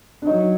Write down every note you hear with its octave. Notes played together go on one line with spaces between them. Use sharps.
D4
F#3 D#4